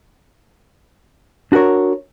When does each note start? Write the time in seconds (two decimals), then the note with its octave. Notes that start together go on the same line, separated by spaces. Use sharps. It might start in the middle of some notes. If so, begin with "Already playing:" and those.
1.52 D4 F#4 A4 A#4 C#5